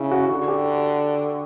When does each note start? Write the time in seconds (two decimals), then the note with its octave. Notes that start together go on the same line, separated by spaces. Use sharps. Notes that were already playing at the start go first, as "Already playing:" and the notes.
Already playing: C#3 E4
0.11 F#4
0.29 D3 F#4
0.48 G4